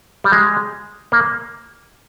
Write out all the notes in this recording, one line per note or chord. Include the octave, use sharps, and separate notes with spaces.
G3
G#3
A#3